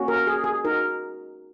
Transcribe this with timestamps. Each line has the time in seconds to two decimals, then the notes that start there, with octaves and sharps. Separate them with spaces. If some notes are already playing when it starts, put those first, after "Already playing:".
Already playing: A#3 C#4 F#4
0.08 A#4
0.27 G#4
0.44 G#4
0.65 D#4 F#4 A#4